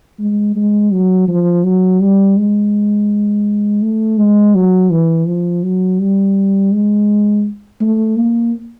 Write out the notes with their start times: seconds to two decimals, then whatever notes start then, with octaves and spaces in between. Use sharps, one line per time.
0.19 G#3
0.56 G#3
0.92 F#3
1.28 F3
1.64 F#3
2.00 G3
2.37 G#3
3.82 A3
4.18 G#3
4.55 F#3
4.90 E3
5.27 F3
5.63 F#3
5.99 G3
6.72 G#3
7.80 A3
8.16 A#3